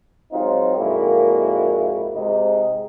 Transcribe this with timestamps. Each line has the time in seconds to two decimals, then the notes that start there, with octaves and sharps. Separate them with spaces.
0.32 G#2 F#3 C4 D#4 F4
0.77 F2 A#2 G#3 A#3 E4 F#4
2.15 G#2 C3 D#4